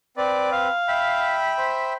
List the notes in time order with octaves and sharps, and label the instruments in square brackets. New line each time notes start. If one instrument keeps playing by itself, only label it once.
[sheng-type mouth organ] C4 B4 [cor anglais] D5
[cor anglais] F5
[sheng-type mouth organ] E5 G5 B5
[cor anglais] C5